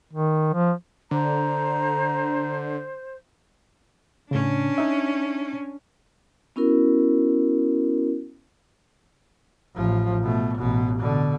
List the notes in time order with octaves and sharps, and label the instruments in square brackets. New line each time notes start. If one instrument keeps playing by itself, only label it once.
[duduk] D#3
F3
[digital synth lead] D3 [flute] C5 [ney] A#5
[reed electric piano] A2 C#3 [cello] C#4 D4
[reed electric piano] D#4 E5
[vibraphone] B3 C#4 E4 F#4 A#4
[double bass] A1 F3
B2 A3
A1 B2
B2 D3